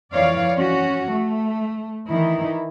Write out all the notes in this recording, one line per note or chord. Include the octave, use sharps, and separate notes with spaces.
F2 E3 C#5 D5 F5
C#4 F#4
A3
D#3 E3 D#4 E4